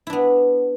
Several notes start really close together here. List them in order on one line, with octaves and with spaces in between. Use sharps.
E4 D4 B3